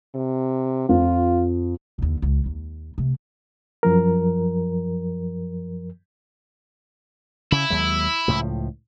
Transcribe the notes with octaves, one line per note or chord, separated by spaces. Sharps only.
C3
F2 F4
D#2 D3
C#2 G#3
D#2
C3 A3
F#2 F3 A#4
C#3 E4
D#2 F#3 G#3
C#2 A2 F3